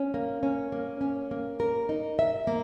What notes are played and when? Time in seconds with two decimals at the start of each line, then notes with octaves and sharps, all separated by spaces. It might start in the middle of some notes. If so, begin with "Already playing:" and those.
Already playing: C#4
0.14 A#3
0.43 C#4
0.72 A#3
1.01 C#4
1.31 A#3
1.60 A#4
1.89 D#4
2.19 E5
2.47 A#3